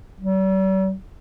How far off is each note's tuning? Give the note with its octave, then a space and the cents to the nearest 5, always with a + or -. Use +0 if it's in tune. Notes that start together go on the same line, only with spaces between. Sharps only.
G3 -45